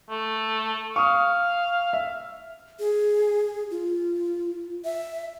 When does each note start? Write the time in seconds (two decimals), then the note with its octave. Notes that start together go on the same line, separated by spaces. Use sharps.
0.10 A3
0.96 F5 C#6 D#6
1.93 E5
2.80 G#4
3.71 F4
4.85 E5